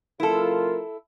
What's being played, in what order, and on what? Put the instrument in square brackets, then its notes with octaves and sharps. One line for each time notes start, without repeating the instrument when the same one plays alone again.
[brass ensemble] F#1 F4 A#4 [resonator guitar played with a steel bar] E4 A4